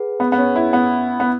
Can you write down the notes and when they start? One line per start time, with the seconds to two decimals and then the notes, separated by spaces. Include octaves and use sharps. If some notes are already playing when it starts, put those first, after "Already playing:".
Already playing: G#4 B4 F#5
0.20 B3
0.32 B3
0.38 C#4
0.56 E4
0.73 B3
1.20 B3